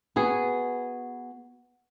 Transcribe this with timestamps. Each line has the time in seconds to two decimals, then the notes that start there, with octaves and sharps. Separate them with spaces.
0.16 B3 F#4 G#4